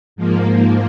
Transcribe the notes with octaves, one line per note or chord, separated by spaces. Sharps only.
G#2 F3 A#3